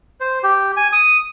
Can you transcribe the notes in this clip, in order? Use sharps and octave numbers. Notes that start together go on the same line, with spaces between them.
C5
G4
G#5
D#6